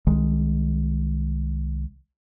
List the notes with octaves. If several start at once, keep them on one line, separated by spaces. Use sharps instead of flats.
C2 D#3 G#3